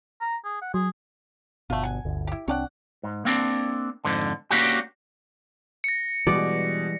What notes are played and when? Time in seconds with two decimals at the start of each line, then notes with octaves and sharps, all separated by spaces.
0.21 A#5
0.45 G#4
0.62 F#5
0.74 F#3 G#4
1.70 G1 B2 A3 F4
1.83 F#5 G#5
2.05 G1 D2
2.27 E4 G4
2.48 C2 C4 D4 C#5 D5 F#5
3.03 G#2
3.25 A#3 C4 D4
4.05 F2 G#2 D3
4.51 A#3 C#4 D4 F#4 G4
5.84 A#6 C#7
6.27 B2 E3 G3 G#3 D5